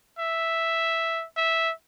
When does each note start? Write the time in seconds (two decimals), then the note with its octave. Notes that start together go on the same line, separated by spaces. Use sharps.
0.19 E5
1.37 E5